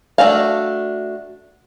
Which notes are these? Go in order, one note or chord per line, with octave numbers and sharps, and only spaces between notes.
A3 D4 F#4 F5